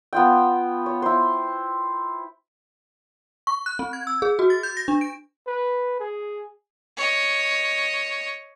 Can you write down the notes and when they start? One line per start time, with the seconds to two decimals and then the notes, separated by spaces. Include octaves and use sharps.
0.13 B3 F4 G5
0.86 C#5
1.02 E4 C5
3.47 C#6
3.66 F#6
3.79 C4
3.93 G#6
4.07 E6
4.22 G#4
4.39 F#4
4.50 A6
4.63 G6
4.77 A#6
4.88 D4
5.01 D7
5.47 B4
6.00 G#4
6.97 C#5 D#5